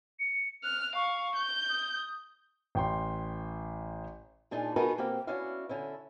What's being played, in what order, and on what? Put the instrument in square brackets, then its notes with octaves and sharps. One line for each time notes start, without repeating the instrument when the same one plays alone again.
[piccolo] C#7
[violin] F6 [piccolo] F#6
[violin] F5 [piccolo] C#6
[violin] G6
[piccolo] D#6
[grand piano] A1 G5 C6
[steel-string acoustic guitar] A#2 D4 D#4 F4 G#4
B3 D#4 F#4 G#4 A#4 B4
B2 A#3 C4 G4 F5
B3 C#4 D4 E4 F#4 F5
D3 C#4 E4